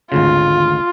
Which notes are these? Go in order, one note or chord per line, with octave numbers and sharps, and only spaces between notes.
G#1 D2 C#3 F4